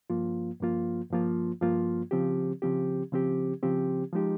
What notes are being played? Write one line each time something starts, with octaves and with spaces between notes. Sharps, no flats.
G2 F3 A#3 F4
G2 F3 A#3 F4
G2 F3 A#3 F4
G2 F3 A#3 F4
C#3 F3 C4 G4
C#3 F3 C4 G4
C#3 F3 C4 G4
C#3 F3 C4 G4
F3 G#3 D#4 G4